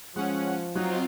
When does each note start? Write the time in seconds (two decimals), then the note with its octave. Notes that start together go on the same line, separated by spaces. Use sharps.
0.16 F3 G#3 C#4 F#5
0.75 F#3 C4 D#4 F4 F#6